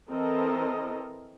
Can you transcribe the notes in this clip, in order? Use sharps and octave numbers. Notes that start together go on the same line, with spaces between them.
E3 C4 A4 A#4 D#5